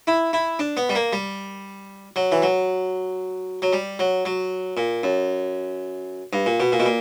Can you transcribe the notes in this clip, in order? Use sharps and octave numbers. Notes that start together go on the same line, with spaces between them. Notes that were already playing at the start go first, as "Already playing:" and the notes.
E4
E4
D4
B3
G3
A#3
G3
F#3
E3
F#3
F#3
G3
F#3
F#3
A#2
F#2
G2
A#2
B2
A#2
B2
A#2